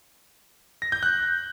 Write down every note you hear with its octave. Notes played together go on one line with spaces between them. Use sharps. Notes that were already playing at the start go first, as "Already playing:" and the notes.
A#6
G6
F#6